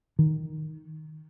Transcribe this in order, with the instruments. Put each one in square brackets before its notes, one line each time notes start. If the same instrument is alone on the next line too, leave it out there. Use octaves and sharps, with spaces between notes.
[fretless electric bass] D#3